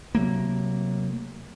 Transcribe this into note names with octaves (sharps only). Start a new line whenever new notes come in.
C3 F#3 A3 A#3